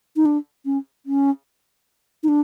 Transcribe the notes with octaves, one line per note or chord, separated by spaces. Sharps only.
D#4
D4
C#4
C#4
D#4
D4